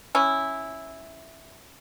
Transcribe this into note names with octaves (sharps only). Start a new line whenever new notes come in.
C#4 E4